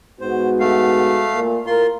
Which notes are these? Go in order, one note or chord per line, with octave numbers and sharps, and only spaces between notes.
G#2 B3 F#4 C5
A3 F5
A#2
A2 F4 A#4 C6